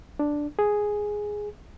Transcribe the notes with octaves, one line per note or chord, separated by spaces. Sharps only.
D4
G#4